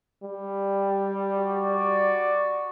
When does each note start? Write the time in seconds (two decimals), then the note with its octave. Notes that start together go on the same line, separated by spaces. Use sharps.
0.24 G3
1.38 F#4 D5